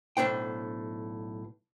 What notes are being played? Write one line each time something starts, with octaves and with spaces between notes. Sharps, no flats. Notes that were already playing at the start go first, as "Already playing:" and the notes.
B1 A2 D4 C5 G5